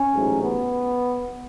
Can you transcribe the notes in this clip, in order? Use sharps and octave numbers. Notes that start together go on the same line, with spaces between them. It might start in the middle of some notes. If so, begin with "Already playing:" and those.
Already playing: C#4
A1 G#2 F#3 A3
B3